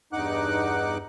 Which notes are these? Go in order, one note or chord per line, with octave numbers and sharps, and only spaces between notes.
E2 G2 D#4 F#5 D6 F#6